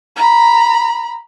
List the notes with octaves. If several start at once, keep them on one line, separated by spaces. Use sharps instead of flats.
A#5 B5